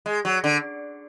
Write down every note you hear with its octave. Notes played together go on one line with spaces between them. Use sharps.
G#3
F#3
D3